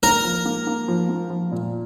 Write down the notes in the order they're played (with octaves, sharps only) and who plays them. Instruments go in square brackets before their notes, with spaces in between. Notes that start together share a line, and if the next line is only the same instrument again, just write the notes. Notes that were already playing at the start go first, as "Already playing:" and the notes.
[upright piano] A#3 [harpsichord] A#4
[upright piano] F3
A#3
A#3
F3
A#3
F3
A#2